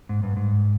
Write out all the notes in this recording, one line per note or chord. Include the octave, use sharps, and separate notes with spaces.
G#2
G2
G#2